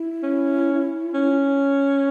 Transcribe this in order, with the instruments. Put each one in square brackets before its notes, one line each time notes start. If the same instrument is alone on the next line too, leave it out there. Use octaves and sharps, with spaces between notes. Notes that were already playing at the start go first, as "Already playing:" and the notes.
Already playing: [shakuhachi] E4
[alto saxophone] C#4
C#4